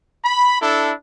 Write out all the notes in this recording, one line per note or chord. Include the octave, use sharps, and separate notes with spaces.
B5
D4 E4 A4